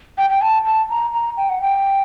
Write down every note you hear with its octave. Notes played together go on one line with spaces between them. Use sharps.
G5
G5
A5
A5
A#5
A#5
G5
F#5
G5